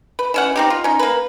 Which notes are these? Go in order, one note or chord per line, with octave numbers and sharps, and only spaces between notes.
B4
E3 C#4 F#5
C4 D#4 G4
F4
C#4 D#4
A#3 B4